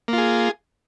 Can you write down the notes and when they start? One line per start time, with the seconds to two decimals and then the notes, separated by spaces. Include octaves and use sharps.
0.08 A#3
0.13 F4
0.18 G#4